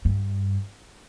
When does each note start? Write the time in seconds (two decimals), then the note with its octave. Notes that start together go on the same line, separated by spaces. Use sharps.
0.05 G2